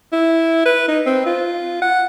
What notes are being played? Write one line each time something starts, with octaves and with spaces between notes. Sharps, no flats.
E4
B4
D#4
C4
F4
F#5